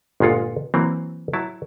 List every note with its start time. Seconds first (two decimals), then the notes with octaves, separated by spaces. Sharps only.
0.20 G1 A#2 G#3 F4 F#5
0.74 E3 F#3 A#3 C4
1.33 F#3 E4 A5